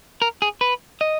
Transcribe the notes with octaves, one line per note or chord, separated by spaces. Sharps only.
A#4
G#4
B4
D#5